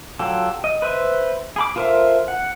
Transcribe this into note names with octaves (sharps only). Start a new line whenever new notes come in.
F#3 F4 G4 A4
D#5
B4 C5 E5
G#4 B5 D6
F4 A4 A#4 C5 E5
F#5